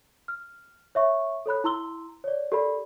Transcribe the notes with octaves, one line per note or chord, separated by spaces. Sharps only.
F6
C#5 E5 C#6
A4 C#5 B5 F#6
E4 A#5 C6 E6 G7
C#5 D5
G4 A4 A#4 D5 B5